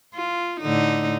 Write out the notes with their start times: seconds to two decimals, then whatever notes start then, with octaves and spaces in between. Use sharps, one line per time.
0.15 F4
0.60 A2 D3 D#4